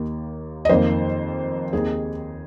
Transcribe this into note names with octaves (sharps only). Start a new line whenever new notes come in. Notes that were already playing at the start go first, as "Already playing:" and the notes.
Already playing: D#2 D#3 A#3
D#5
F2 D#3 A#3 C5
D#2 D#3 C4 D#4 G#4